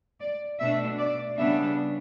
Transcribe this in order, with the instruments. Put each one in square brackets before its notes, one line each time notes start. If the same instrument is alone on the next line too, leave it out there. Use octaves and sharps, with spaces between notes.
[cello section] D5
B2 A3 D4 E5
D5
C#3 G3 B3 D4 E5